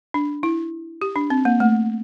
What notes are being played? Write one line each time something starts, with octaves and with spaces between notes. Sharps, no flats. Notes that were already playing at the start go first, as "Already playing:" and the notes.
D4
E4
G4
D4
C4
A#3
A3